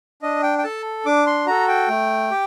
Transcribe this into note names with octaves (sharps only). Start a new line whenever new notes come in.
D4 D#5
G5
G5
A4 A5
D4 D6
C6
F#4 A4 A#5
G5
A3
G4